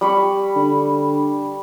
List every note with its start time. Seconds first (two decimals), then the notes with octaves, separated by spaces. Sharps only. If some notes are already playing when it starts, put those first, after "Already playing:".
0.01 G3 B5 C#6
0.56 D3